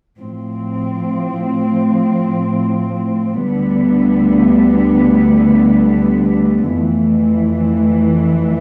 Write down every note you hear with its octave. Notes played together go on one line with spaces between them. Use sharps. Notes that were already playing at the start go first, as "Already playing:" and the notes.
A2 F3 C4
D2 D3 G3 B3
F2 E3 A3